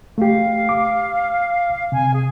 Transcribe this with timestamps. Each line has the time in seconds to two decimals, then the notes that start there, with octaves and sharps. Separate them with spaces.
0.18 A3 G4 F5
0.69 D6
1.92 C3 G#5
2.13 G#4